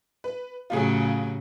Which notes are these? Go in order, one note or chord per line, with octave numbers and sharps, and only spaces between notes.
B4
A2 C#3 F#3 F4 G4 G#4